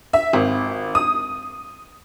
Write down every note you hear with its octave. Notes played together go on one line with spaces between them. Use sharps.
E5
G#1
D#6